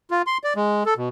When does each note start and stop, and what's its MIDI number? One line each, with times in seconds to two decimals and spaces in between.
0.11 0.22 65
0.26 0.38 84
0.44 0.53 74
0.56 0.83 56
0.86 0.94 69
0.97 1.09 47